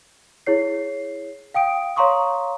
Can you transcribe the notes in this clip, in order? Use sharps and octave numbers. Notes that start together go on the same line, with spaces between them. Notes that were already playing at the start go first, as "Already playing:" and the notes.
E4 G#4 C#5 C7
F5 G5 D#6 D7
C#5 F5 A#5 C6 C#6 D#6